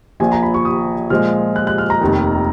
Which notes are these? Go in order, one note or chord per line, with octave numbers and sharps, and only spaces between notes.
A#1 A#2 F3 G#5
A#5
B5
C#6
D#6
A#2 F3 G#3 F6
F#6
F#6
F6
A#5
F1 D#2 D#3